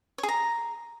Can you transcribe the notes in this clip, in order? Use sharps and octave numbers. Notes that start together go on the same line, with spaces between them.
C#5
G#4
A#5